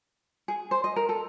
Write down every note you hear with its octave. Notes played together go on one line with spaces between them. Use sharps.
G#4
C5
D#5
A#4
A4